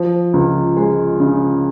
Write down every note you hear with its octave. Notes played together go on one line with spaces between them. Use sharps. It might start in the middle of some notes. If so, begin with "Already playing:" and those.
Already playing: F3
C#2
G#3
C#3